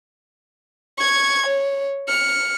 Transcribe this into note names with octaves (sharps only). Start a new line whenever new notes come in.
C#6 G#6
C#5
F6 C#7